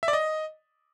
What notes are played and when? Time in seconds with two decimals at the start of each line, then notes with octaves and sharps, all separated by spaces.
0.03 E5
0.08 D5
0.13 D#5